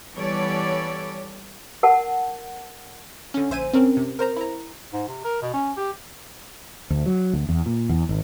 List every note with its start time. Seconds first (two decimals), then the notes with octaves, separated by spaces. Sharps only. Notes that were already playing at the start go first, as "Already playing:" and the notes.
0.15 E3 G3 B3 A4 C#5 D5
1.83 A#4 F#5 A5
3.34 D3 C#4
3.50 A#1 C5 E5 G#5 D#7
3.74 C4 C#4 A#4
3.97 C3
4.19 A#4 C5 A#5
4.36 E4 A#5
4.93 G#2
5.08 C3
5.25 A#4
5.42 B2
5.54 C#4
5.77 G4
6.90 D2
7.06 F#3
7.33 D2
7.49 E2
7.66 A#2
7.89 E2
8.09 G#1